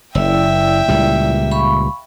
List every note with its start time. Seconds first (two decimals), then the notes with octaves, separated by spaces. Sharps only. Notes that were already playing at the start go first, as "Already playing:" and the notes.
0.15 F#1 E4 D5 E5 G5 E6
0.88 C#2 A#2 G3
1.51 F5 B5 C#6